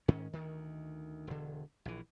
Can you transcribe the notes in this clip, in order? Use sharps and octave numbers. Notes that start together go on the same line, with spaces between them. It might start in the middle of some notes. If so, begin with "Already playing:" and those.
G#2 D#3 C#4
D2 D#3
E1 D3
A#1 E3